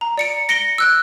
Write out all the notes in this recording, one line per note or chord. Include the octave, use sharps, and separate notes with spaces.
A#5
D5 C#7 D7
A#6 C#7 D7 G7
E6 F#6 D7